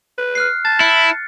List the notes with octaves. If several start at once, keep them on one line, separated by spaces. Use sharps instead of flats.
B4
F6 F#6 C7
A5 A6
E4 C#7